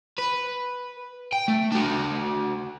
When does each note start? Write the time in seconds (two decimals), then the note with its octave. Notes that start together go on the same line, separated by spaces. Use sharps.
0.19 B4
1.32 G5
1.48 A3
1.72 D4 F#4